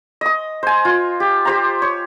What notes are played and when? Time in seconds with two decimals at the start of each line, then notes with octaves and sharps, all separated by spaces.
0.21 D#5 D#6
0.63 C5 G#5
0.85 F4
1.20 G4
1.45 G4 C5 A#5
1.82 C#5